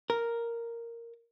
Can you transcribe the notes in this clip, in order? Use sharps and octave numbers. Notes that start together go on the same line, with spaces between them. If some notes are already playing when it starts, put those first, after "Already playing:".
A#4